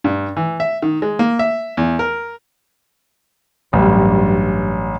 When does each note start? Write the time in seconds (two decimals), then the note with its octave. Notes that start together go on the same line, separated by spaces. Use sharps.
0.04 G2
0.37 E3
0.60 E5
0.82 D#3
1.02 G#3
1.19 A#3
1.39 E5
1.77 E2
1.99 A#4
3.73 A1 G2 F#3 G3